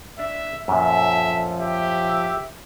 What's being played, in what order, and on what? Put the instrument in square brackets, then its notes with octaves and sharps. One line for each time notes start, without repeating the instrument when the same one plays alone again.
[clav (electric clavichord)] D4 D5 [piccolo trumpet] E5
[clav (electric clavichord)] F#2 A#2 [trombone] F3 [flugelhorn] A4 [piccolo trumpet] E5
[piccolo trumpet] G4 [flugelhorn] E5